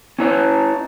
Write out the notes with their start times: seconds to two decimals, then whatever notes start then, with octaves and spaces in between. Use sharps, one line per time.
0.19 C#4 E4 C#5